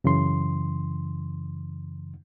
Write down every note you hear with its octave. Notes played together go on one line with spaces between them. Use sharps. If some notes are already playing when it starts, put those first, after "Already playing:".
F#2 C#3 E3 C6